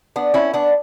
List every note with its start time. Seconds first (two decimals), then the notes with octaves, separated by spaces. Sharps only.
0.16 B3 D4
0.34 C#4 E4
0.54 B3 D4